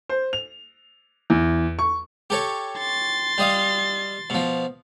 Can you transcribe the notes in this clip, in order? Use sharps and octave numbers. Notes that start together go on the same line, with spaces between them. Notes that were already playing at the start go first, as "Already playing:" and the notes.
C5
F7
E2
C#6
G4 A4 C#5
C6 A6
G3 D#5 F5
B2 F3